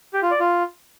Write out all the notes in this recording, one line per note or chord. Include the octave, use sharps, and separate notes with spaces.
G4
F4
D5
F4